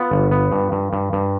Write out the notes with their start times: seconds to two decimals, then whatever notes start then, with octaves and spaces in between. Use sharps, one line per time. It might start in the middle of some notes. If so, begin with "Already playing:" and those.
Already playing: B3 F4
0.11 G1
0.31 B3
0.52 G2
0.72 G2
0.93 G2
1.13 G2